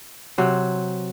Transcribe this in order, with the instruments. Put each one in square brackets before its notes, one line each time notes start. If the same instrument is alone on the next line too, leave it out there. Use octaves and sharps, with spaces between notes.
[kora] C3 F#3 C5